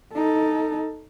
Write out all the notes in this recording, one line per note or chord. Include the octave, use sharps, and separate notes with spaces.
D#4 A4